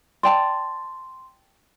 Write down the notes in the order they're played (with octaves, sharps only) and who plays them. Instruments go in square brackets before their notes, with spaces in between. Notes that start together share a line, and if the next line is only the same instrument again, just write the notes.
[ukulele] D5 G5 A5 [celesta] C6